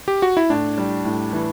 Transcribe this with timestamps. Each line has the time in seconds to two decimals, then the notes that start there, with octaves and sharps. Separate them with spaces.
0.08 G4
0.22 F#4
0.37 E4
0.50 A2 D4
0.78 G3
1.05 A2
1.33 E3